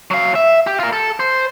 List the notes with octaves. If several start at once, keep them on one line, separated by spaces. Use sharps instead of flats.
F#3 F5
E5
G4
F4 A#4
A4
C5